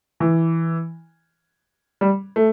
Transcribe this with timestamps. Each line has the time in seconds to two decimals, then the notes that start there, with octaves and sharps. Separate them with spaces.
0.20 E3
2.01 G3
2.36 A3